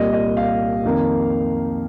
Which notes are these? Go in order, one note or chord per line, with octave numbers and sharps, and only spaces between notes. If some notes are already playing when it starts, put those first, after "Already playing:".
Already playing: C2 A#2 G3 D#5
D#5
F5
F2 D#3 A#3 D#4